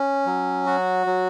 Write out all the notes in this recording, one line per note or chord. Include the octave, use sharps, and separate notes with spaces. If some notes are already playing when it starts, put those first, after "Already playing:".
Already playing: C#4
F#3
F#4
F#3